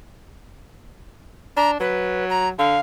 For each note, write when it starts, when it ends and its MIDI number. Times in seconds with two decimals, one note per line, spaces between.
1.57 1.76 62
1.57 1.71 82
1.80 2.52 54
1.80 2.25 71
2.30 2.48 82
2.59 2.79 50
2.59 2.80 77